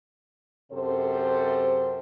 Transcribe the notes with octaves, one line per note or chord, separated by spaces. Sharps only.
F#2 C3 A4 C5